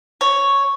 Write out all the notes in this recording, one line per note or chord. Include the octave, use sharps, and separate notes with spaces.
C#5